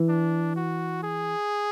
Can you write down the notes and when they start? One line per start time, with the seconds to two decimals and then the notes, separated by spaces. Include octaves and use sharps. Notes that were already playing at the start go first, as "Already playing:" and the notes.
Already playing: E3
0.09 D4
0.56 F#4
1.03 G#4